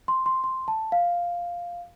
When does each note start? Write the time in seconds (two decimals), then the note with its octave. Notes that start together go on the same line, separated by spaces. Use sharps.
0.08 C6
0.26 C6
0.44 C6
0.68 A5
0.92 F5